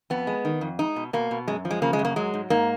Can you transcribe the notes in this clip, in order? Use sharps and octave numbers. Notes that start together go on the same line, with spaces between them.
F2 B3
G#3
D#3
F2
G#3 D#4
B2
B2 A#3
B2
F#2 G#3
F3
G#3
C#3 A#3
G#3
F#2
A#3
F#3 G#3
G#2
G#2 A#3